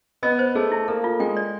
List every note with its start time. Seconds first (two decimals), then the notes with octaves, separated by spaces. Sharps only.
0.23 B3 D#5
0.39 C5
0.55 A3 G#4
0.71 E4
0.88 A#3 A4
1.04 F4
1.20 G#3 G5
1.37 D5